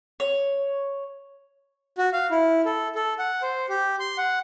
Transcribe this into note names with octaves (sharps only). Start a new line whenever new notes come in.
C#5
F#4
F5
E4
A4
A4
F#5
C5
G4
C6
F#5